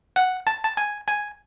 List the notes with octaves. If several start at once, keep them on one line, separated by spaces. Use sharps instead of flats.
F#5
A5
A5
G#5
G#5